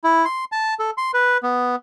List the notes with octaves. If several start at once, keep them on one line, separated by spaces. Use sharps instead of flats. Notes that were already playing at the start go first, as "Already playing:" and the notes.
E4
C6
A5
A4
C6
B4
B3